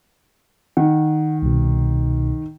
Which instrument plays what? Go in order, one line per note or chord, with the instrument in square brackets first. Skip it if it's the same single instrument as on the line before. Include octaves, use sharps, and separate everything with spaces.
[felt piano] D#3 [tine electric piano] F#5
[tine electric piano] C2 B2